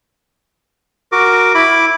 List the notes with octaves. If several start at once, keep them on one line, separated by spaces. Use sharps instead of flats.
F#4 A#4 D6
E4 B5 D6